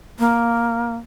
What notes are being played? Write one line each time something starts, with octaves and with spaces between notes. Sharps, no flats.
A#3